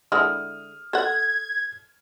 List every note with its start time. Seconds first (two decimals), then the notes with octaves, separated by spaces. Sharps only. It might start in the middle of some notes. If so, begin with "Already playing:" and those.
0.12 D3 G#3 E4 D#6 F6
0.93 A4 F#5 G#6